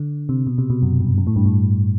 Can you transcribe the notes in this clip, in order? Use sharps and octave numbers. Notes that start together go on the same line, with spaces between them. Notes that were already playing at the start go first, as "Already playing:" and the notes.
Already playing: D3
C3
B2
C3
B2
F#2
G2
F#2
A2
G2
A2